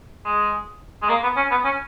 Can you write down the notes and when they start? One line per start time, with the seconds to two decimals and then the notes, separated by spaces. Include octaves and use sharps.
0.25 G#3
1.02 G#3
1.09 A#3
1.23 B3
1.36 C#4
1.51 B3
1.64 C#4